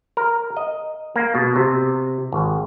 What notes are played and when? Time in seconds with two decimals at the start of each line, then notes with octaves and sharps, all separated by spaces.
0.17 A#4
0.57 D#5
1.16 A#3
1.35 B2
1.56 C3
2.32 G#1